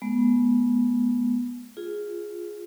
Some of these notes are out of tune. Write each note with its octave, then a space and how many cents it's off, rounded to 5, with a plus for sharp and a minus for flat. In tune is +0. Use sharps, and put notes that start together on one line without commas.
G#3 +35 B3 -15
F4 +0 G#4 +0